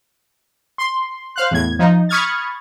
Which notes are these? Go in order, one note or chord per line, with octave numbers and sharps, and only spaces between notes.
C6
C5 F5 F#6
E2 A2 G#6
F3 D#4
B5 C#6 D#6 F6 G#6 A6